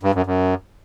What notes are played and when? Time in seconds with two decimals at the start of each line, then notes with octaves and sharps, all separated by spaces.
0.03 G2
0.15 F#2
0.26 F#2